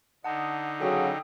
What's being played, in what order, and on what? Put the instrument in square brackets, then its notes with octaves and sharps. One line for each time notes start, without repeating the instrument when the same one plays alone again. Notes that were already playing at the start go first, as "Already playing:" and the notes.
[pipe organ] D3 D#4 [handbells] F#5 A5 D#6
[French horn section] C#3 F#3 F#4 [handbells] A4 G5 D#6